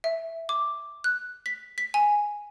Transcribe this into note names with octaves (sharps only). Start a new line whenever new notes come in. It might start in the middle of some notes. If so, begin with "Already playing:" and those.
E5
D6
F#6
B6
B6
G#5